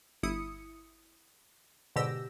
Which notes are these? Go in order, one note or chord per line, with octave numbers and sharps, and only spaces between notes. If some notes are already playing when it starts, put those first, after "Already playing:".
G1 E4 D#6 C#7
G#2 B2 D3 G4 E6 A#6